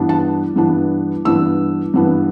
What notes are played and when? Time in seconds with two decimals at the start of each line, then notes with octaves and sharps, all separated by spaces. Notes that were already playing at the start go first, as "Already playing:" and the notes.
Already playing: G2 E3 B3 D4
0.09 A5
0.56 G2 E3 B3 D4
1.25 G2 E3 B3 D4 E6
1.94 G2 E3 B3 D4